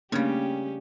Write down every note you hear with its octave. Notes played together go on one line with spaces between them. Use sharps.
C#3 G3 A3 A#3 C#4 D4 G4